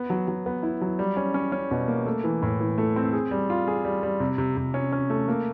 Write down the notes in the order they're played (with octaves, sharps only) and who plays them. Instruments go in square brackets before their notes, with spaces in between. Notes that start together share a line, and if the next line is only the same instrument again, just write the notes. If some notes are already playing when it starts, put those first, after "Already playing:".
Already playing: [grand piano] B3
F#3
F#3
B3
E4
F#3
G3
C#4
C#4
C#4
B2
A#3
A3
E3
A2
E3
A3
C4
G#4
G3
F4
G#4
G3
G3
C3
C3
C3
C#4
C#4
A3
A#3